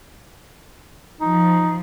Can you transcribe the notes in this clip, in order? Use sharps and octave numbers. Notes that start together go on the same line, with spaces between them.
F3 D#4